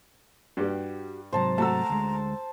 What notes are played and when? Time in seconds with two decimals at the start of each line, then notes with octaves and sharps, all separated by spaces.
0.57 G2 G3 F#4 G4
1.33 G#2 C3 F#3 C5 A5 A#5
1.58 A3 F#4 A5 A#5 E6
1.89 D2 G#3